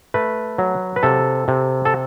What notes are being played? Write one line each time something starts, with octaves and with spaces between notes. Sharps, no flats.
A3 B4
F#3
B4
C3 A4
C3
A4